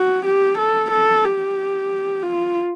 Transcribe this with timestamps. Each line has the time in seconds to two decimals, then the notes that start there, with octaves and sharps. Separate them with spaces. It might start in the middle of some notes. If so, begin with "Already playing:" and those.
Already playing: F#4
0.26 G4
0.59 A4
0.91 A4
1.25 G4
2.23 F4